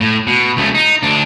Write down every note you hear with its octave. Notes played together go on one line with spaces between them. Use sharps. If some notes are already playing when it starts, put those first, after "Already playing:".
A2
B2
C#2 A3
D#4
D2 D4